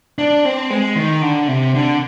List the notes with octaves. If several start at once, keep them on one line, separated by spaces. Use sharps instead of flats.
D4
C4
G#3
D#3
D3
C3
D3